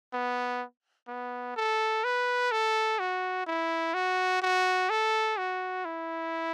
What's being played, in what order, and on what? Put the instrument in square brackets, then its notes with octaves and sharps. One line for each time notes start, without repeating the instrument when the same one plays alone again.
[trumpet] B3
B3
A4
B4
A4
F#4
E4
F#4
F#4
A4
F#4
E4